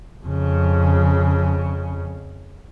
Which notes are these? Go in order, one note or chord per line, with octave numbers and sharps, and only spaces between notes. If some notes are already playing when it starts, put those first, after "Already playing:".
F2 C#3